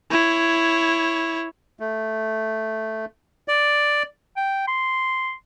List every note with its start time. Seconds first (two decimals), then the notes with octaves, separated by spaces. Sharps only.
0.11 E4 C#5
1.80 A3
3.48 D5
4.36 G5
4.68 C6